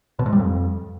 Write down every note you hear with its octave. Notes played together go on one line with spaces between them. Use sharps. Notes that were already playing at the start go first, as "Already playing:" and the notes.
B2
G#2
G3
F2